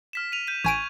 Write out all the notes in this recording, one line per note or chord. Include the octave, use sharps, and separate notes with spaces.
F6 B6 E7
D#7 F7
G6 B6 D#7
A1 G#5 C#6 G#6 D7 D#7